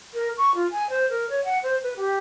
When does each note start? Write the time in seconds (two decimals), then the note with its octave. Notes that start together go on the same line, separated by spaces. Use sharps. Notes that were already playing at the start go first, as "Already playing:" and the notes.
0.14 A#4
0.38 C#6
0.55 F4
0.71 G#5
0.90 C5
1.10 A#4
1.30 C#5
1.45 F#5
1.63 C5
1.83 B4
1.96 G4